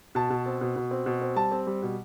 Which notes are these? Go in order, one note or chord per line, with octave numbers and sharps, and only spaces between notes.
B2 A5
B2
C4
B2
B2
C4
B2
C4
G3 A5
C4
G3
B2